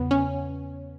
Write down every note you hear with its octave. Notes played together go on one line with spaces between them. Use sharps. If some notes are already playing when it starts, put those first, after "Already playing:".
Already playing: E2 C#3 B3
C#4